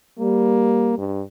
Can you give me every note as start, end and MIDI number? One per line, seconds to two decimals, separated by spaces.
0.19 0.98 55
0.19 0.97 58
0.98 1.22 43